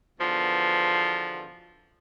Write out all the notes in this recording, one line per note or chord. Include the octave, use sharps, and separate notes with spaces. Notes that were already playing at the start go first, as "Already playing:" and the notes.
E2 B2 D3 F3